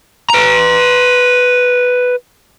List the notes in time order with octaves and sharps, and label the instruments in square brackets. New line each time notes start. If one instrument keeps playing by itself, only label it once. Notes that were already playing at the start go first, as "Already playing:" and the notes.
[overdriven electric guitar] B4 A#5